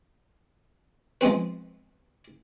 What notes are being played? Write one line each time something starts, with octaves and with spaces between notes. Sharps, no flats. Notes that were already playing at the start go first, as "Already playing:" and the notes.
F3 G#3 B3 C4 B4